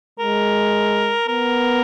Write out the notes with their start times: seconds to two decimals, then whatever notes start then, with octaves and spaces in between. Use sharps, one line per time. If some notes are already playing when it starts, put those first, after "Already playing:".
0.19 G#3 A#4
1.28 B3 A#4